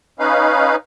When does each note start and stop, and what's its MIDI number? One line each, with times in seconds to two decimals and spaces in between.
0.20 0.76 61
0.20 0.76 63
0.20 0.76 71
0.20 0.76 77